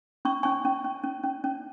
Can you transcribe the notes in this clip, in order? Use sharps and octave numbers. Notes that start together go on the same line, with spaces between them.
C#4 C#6
C#4 G#5 C#6
C#4
C#4
C#4
C#4
C#4